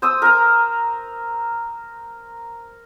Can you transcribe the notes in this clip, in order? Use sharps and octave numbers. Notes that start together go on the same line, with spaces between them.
C5 D#6 E6
A#4 A#5